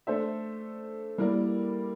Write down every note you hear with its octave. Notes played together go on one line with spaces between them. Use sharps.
A3 D4 A4 C5 E5
G3 A#3 E4 A#4 D5